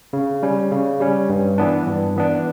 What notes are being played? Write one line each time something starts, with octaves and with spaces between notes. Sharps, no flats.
C#3
G3 C#4
C#3
G3 C#4
G2
E3 B3 D4
G2
E3 B3 D4